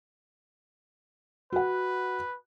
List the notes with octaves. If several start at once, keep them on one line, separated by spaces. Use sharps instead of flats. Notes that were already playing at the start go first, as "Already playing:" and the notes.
F#4 B4 F#5